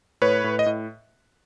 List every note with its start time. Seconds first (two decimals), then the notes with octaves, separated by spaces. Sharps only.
0.22 A2 B4 C#5
0.44 A2
0.59 D#5
0.66 A2